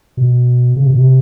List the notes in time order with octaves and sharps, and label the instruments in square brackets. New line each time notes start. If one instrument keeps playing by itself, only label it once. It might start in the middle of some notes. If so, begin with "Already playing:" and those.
[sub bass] B2
C#3
C3
B2
C3